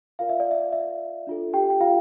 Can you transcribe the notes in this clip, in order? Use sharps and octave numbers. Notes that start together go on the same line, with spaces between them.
F4 A#4 D5 F5
E5
D5
E5
E5
D4 F4 A4
G4 G5
G5
F4 F5